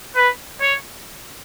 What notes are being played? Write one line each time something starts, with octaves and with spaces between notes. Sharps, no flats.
B4
C#5